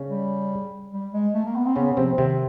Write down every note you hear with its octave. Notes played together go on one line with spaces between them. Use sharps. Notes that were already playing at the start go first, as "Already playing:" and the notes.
Already playing: C#3 C#4
G3
G3
G#3
A3
A#3
B3
C4
C#3 B3 C#4
C3 F3 C4
C3 D#3 C4